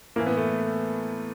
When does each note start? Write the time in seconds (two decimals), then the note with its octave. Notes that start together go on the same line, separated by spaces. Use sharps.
0.16 A2 A#3
0.19 E3
0.26 B3
0.37 A3